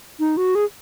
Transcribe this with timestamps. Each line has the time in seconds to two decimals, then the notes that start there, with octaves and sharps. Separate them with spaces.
0.20 D#4
0.37 F#4
0.55 G#4